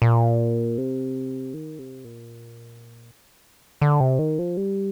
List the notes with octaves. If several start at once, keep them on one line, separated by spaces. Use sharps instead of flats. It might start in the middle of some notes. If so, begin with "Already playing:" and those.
A#2
C3
D#3
C3
A#2
D3
C3
D#3
F3
G3